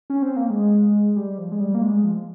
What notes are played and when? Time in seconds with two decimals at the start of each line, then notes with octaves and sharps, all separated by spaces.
0.10 C#4
0.22 C4
0.36 A#3
0.50 G#3
1.16 G3
1.38 F3
1.52 G#3
1.60 G3
1.75 A#3
1.82 G#3
2.04 F3